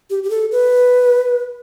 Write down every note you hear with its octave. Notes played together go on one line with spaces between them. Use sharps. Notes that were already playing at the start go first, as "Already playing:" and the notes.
G4
G4
A4
B4